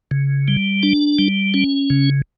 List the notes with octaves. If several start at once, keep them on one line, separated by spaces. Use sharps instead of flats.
C#3
G3
D4
G3
C#4
C#3